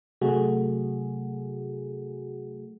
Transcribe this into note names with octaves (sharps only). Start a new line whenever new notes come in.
C3 F#3 A3 F#4 G#4